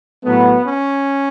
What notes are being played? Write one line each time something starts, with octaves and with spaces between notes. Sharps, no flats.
A2 F#3 A3 B3
C#4